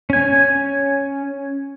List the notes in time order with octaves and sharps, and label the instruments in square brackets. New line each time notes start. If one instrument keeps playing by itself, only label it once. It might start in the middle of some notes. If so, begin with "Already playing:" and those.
[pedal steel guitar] C#4 G#5